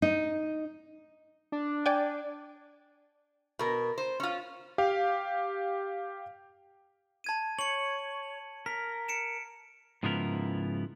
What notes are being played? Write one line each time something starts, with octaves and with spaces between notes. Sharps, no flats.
D#4
D4
D5 G5 G#5
B2 A#4
C5
C#4 F4
G4 F5
A5 G#6 D#7
C#5 C#7 F#7
A#4 B6
C#7 D7 E7
G#2 C#3 F3 B3 E4 A#4